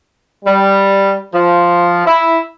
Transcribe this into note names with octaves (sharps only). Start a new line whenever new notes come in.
G3
F3
E4